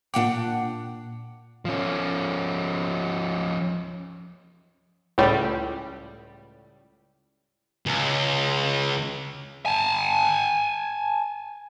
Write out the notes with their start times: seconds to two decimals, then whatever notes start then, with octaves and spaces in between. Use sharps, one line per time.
0.14 A#2 D4 F#5 G5 D6
1.65 F3 C#4
5.18 C#2 A2 G3
7.86 C#2
9.66 G#5 A5